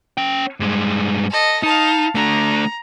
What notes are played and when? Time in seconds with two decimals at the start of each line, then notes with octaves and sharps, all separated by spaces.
0.18 C#4 G5
0.60 G2 G#3
1.30 A4 D#5
1.63 D#4 F5 A5
2.15 A3 D4 A#5